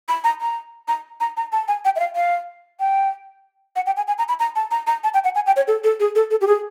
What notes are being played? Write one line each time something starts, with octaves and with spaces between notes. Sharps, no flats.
B5
A#5
A#5
A#5
A#5
A#5
A5
G#5
G5
E5
F5
F5
G5
F#5
G5
G#5
G#5
A#5
B5
A#5
A5
A#5
A#5
A5
G5
F#5
G#5
G5
C#5
A4
A4
G#4
A4
A4
G4
G#4